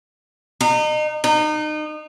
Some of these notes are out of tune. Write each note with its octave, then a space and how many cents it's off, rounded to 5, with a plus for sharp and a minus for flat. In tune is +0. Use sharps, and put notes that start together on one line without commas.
D#4 -30
D#4 -30